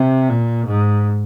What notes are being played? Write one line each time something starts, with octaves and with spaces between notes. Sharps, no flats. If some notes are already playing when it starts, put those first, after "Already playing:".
Already playing: C3
A#2
G#2